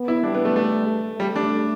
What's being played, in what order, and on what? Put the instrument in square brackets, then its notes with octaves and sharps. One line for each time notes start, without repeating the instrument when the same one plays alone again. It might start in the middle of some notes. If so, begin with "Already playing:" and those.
Already playing: [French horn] B3
[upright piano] E4
[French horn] G3 [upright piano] D4
[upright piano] B3
A3
A3
[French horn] A3
[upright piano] G3 [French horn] A3
[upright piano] D4